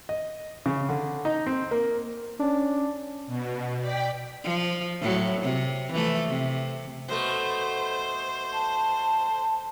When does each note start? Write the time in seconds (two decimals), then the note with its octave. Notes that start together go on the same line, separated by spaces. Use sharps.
0.09 D#5
0.66 C#3
0.89 D3
1.25 D#4
1.47 C4
1.71 A#3
2.40 C#4 D4
3.27 B2
3.80 D5 G5 B6
4.44 F3
5.00 A2 F#3
5.41 C3
5.92 E3 F3 A3
6.29 C3
7.09 B2 A3 C5
8.53 A5